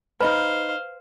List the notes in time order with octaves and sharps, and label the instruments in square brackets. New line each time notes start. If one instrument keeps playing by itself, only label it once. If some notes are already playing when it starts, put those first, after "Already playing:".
[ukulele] D#4 D#5 B5 [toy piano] B4 [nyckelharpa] C5 F5